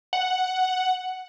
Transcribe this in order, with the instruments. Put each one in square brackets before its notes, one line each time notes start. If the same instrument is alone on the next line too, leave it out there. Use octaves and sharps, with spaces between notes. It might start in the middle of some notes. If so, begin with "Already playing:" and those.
[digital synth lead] F#5